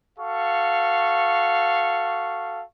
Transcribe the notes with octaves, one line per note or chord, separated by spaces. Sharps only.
F#4 A4 F5 C#6